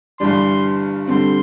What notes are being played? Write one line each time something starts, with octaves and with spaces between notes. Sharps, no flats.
G1 G2 E3 G3 D4 C6
G2 D3 G3 C4 C6